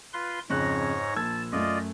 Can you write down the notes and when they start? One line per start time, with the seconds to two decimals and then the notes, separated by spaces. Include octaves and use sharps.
0.13 F4 B4 C6
0.50 F2 G#2 C#3 C#5 F#6 A#6
1.16 A#1 A5 E6 G#6
1.52 F#2 A3 F4 D5 D#5